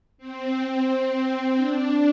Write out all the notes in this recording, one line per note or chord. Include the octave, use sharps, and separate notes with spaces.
C4
D4